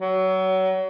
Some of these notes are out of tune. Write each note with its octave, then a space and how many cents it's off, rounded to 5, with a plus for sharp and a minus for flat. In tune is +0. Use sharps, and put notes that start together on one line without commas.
F#3 +25